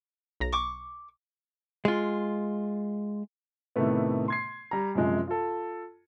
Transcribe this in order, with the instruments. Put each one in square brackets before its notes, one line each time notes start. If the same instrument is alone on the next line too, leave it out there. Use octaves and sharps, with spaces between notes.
[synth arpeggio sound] B1 A#5 A#6
[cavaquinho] C#6 D6
[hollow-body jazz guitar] G#3 F4
[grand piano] A2 C3 D#3 A3 B3
C6 G#6 C7
G3 A#5
F#2 C3 F3 G#3
F4 A4